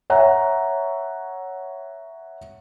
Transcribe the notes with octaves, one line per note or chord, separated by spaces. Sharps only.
C#5 E5 F#5 A#5